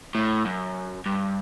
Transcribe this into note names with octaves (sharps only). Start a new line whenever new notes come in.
A2
F#2
G2